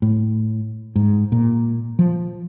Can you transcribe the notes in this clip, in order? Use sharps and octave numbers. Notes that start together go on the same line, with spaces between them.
A2
G#2
A#2
F3